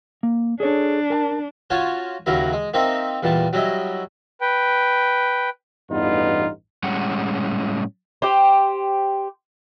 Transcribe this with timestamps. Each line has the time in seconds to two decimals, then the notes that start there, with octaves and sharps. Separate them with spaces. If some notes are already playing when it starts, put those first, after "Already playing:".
0.23 A#3
0.60 D4 G#4 A4 C#5
1.10 A#4 G#5 A5
1.70 C#4 F4 F#4 C#5 G#5 A5
2.26 D#2 C#3 F#3 E4 A#4
2.53 G#3
2.74 A#3 C4 D#4 A#4 E5
3.23 E2 A#2 G3 A5
3.53 F#3 G3 C#4 E4 D#5
4.41 B4 G5
5.90 A1 E2 G2 B3 D#4 F4
6.83 A2 G3 G#3 C#4 F#5
8.22 G4 C5